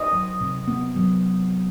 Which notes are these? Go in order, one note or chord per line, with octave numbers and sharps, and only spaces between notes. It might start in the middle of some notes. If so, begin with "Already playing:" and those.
Already playing: D#5
F#3
C3
B3
F#3